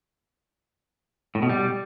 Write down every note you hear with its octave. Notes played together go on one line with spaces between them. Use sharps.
A2
B2
G3